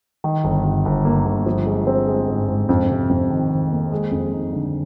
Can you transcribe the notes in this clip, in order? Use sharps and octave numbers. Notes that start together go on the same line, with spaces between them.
D#3
G1
G1
G1
A#3
G1
F3
G#3
C4
G#3
G#2
G#2
F2
C3
F2
D#3
D#3
A#3
G#3
F2
D#4
D3